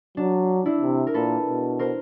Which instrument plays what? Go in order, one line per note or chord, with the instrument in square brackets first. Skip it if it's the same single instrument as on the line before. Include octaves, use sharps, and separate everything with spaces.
[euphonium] F#3 [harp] D4
[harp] D4 E4
[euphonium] C3
[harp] A#4
[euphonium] A#2 [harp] A4 B4
[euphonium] B2
[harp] A#4 C5